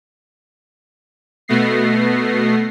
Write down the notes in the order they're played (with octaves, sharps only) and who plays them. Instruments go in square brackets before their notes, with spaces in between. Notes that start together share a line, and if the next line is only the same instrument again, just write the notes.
[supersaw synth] B2 A3 B3 A#6 C7